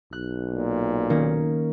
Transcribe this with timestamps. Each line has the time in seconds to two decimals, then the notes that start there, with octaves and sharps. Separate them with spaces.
0.13 B1 F#6
0.51 A#2
1.10 D#3 A#3 C#4